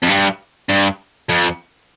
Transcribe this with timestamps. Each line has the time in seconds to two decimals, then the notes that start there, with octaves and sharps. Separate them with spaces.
0.03 F2
0.09 G2
0.69 G2
1.29 F2